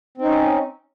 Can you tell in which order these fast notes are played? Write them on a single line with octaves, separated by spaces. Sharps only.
C4 D#4 C#4